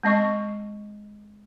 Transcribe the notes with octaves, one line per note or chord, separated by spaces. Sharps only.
G#3 C4 D#5 C#6